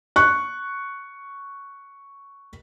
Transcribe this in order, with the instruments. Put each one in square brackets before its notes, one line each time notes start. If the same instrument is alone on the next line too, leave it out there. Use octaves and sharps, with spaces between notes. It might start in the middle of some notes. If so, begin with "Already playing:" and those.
[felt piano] C#6 F#6